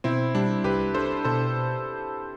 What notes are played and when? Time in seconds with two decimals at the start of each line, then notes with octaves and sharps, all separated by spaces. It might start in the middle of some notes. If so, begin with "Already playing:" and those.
0.04 B2 C4 E4
0.35 G3 D4
0.64 C2 G4 B4
0.94 D4 A4 C5
1.24 B2 A4 C5